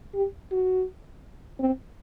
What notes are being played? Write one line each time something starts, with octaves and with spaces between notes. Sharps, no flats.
G4
F#4
C4